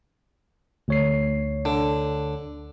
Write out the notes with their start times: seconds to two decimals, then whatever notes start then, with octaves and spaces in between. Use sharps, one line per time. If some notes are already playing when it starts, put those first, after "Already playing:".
0.88 D2 C#5 C7
1.65 D3